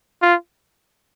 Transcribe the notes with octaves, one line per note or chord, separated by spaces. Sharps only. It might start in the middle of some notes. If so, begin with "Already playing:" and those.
F4